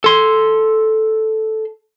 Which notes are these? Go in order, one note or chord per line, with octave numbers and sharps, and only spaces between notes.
A4 C6